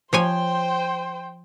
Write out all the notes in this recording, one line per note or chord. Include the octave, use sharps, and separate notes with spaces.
F3 C5 C#5 G5 G#5